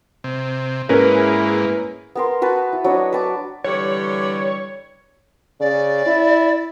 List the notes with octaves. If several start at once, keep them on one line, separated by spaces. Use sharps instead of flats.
C3
G#2 A#3 C#4 E4 G#4 A#4 B4
B3 A#4 C6
F#4 B4 A5
E4
F#3 D4 C#5 D#5
B4 A5 D6
D3 E3 G3 C#5
C#3 D5
E4